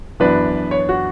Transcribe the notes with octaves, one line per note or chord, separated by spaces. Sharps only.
F#2 E3 B3 D4 B4
C#5
F#4